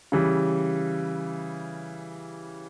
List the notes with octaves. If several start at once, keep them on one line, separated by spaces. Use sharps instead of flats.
C#3 E3 G3